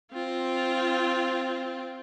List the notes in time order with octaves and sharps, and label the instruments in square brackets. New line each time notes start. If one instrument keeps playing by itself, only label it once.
[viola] C4 F4